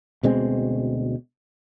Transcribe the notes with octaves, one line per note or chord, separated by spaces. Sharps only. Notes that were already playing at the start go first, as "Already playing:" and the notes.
D2 B2 G#3 C4